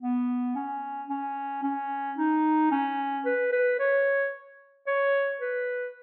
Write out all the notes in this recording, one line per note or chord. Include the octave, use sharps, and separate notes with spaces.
B3
C#4
C#4
C#4
D#4
C#4
B4
B4
C#5
C#5
B4